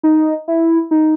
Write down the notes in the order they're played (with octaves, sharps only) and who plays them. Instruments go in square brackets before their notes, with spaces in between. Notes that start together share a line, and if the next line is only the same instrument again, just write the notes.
[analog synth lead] D#4
E4
D#4